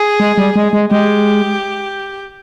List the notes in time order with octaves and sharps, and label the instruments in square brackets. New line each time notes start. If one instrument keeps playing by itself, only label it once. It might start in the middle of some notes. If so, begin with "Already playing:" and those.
Already playing: [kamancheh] G#4
[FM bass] G#3
G3
G#3
G#3
[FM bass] G#3 [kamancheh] G4